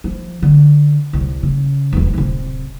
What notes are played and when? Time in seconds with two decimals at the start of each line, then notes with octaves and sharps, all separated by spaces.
0.04 F3
0.43 D3
1.13 C2
1.43 C#3
1.93 E1 F2
2.14 D1 C3